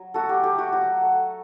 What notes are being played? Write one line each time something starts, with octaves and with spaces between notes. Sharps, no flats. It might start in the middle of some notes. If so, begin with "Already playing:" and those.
Already playing: F#3
A3 F#4 A4
G4
A3 G4
F#4
F#3 F#4
A3